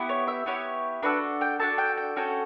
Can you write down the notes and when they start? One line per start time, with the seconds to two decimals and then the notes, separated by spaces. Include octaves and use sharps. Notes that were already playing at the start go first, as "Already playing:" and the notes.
Already playing: B3 E4 G4
0.09 C#5
0.27 E5
0.46 B3 E4 G4 C#5
1.03 D4 F#4 A4 B4
1.41 G5
1.59 D4 F#4 A4 A5
1.78 G5
1.97 G5
2.16 C#4 F#4 A4 G5